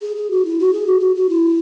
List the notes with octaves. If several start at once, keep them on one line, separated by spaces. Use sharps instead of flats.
G#4
G#4
F#4
E4
F#4
G#4
F#4
F#4
F#4
E4